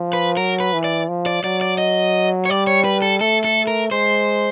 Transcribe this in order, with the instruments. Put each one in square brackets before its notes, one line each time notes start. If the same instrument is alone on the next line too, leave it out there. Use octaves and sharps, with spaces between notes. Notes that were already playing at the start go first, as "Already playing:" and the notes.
Already playing: [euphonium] F3
[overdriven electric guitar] B4
[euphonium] F#3 [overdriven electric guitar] A#4
[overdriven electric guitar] B4
[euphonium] E3
[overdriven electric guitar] D5
[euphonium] F3
[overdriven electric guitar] D5
[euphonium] F#3 [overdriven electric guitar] D5
[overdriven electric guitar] D5
D#5
C#5
[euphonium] G3 [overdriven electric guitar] D5
[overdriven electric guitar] C#5
B4
A4
[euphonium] A3 [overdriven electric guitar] A4
[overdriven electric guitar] A4
A#4
[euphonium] G#3 [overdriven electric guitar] C5